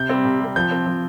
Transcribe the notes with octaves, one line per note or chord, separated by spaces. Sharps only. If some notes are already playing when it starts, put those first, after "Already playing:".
Already playing: C3 G6
G3 C4
C3
G3 C4
F3 G6
C4
F3